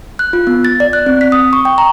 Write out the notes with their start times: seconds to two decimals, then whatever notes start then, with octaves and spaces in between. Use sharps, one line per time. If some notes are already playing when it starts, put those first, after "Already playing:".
0.19 F#6
0.33 F4
0.47 B3
0.65 A6
0.80 D5
0.93 F#6
1.06 C4
1.21 B6
1.32 D#6
1.53 C#6
1.65 G5
1.78 A#5